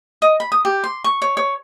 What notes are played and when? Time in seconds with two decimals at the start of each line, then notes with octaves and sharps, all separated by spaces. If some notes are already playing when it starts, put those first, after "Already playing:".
0.22 D#5
0.40 B5
0.52 D#6
0.65 G4
0.84 C6
1.04 C#6
1.22 C#5
1.37 C#5